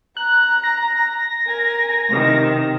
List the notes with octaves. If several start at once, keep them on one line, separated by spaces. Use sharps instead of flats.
A#5 F#6
A#6
A#4 G#5
C3 D#3